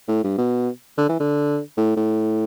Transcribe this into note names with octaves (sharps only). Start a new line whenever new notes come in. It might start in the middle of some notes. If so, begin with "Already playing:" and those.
A2
G2
B2
D3
E3
D3
A2
A2